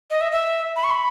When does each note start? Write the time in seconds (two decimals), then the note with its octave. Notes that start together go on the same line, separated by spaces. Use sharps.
0.10 D#5
0.21 E5
0.32 E5
0.76 B5
0.84 C#6
0.91 B5